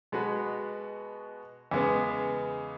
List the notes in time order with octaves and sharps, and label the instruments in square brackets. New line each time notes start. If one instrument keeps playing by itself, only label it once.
[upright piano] B2 G#3 B3 F#4 B4
E2 C#3 G#3 B3